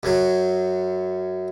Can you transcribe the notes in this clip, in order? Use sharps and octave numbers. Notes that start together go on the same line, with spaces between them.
F#2 F#3